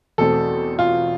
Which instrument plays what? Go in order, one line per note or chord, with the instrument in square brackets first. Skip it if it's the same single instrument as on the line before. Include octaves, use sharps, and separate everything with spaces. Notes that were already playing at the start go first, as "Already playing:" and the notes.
[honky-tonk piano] E2 B2 A3 C4 [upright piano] A4
[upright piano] F4